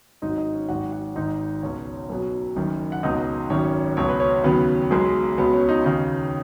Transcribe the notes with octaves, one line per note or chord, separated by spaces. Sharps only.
G#1 G#2 F#3 D#4 D#5
D#4 D#5
C#4 C#5
G#1 G#2 F#3 F#4 F#5
F#4 F#5
G#1 G#2 D#3 D#4 D#5
C#2 B2 F#3 C#4 C#5
B1 B2 F#3
F#1 F#2 D#3
F#5
C#2 B2 F#3 D#4 D#5
G#1 F#2 D#3 F#3 C#4 C#5
C#2 B2 F#3 C#5
B4
C#4 C#5
D#2 C#3 F#3 B3 B4
B1 B2 F#3 G#3 G#4
C#2 B2 F#3 B3 B4
C#4 C#5
D#4 D#5
D#2 C#3 F#3 D#4 D#5